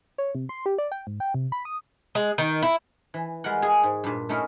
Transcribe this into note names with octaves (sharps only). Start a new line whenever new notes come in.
C#5
C3
C6
G4
D5
G5
G#2
G5
C3
B5
D#6
G#3
D#3
E4
E3
G3 G#3 A#4 F#5
G#4 D#5
G#2
G2 A#2
A3 C#4 D#4 E4 A#4